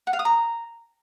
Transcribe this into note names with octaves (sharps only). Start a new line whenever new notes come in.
F#5
F5
D#6
A#5